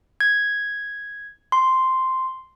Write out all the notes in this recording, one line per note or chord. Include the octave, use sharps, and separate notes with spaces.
G#6
C6